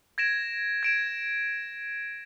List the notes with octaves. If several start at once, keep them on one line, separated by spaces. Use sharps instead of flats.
G#6 A#6 D7 E7
G#6 D7 E7